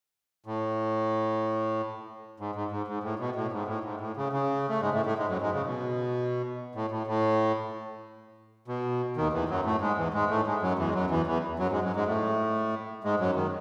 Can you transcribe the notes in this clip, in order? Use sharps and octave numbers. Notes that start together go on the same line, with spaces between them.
A2
G#2
G#2
G#2
G#2
A2
B2
A2
G#2
A2
G#2
A2
C#3
C#3
A3
G#2 G#3
A2 A3
A2 A3
G#2 G#3
F#2 F#3
G#2 G#3
C#3
B2
A2
A2
A2
B2
D#2 D#3
E2 E3
F#2 F#3
A2 A3
G#2 G#3
E2 E3
G#2 G#3
A2 A3
G#2 G#3
F#2 F#3
E2 E3
G#3
F#2 F#3
E2 E3
E2 E3
F#2 F#3
G#2 G#3
F#2 F#3
G#2 G#3
A2 A3
G#2 G#3
F#2 F#3
D#3